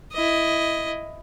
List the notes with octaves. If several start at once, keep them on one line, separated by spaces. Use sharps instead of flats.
E4 D#5